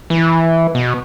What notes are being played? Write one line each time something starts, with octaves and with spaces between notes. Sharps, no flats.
E3
B2